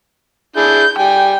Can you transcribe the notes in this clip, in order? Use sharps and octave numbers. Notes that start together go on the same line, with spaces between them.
D4 E4 G#4 G6
G3 G5 G#5